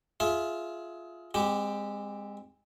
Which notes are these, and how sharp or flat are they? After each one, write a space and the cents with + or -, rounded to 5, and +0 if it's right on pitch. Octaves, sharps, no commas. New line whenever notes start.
F4 +0 G#4 +20 E5 +0
G#3 -30 C4 +0 G4 +0